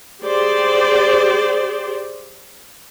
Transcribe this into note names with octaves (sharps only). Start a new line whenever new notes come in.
G4 G#4 C5 D5